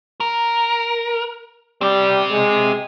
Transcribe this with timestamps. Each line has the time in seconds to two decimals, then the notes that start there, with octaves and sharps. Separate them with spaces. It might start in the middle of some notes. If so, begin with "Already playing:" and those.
0.20 A#4
1.81 G3 C4 G4
2.31 G#3